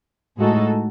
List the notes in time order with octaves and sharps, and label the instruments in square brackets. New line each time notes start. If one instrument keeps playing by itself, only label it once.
[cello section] A2 G#3 D#4 F#4 A4